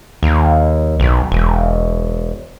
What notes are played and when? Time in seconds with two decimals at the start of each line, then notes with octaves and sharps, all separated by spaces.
0.23 D#2
1.00 B1
1.32 E1